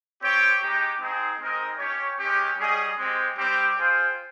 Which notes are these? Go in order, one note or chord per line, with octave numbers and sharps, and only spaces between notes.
C4 G4 C#5 G5
G#3 D#4 G4
C4 D#4 G#4
G#3 C4 D#4 A#4 D#5
C#4 G4 C#5
G#3 C#4 G4
G3 C#4 G#4 D#5
G#3 C4 G4
G3 C4 G4
F4 G#4 C5 G5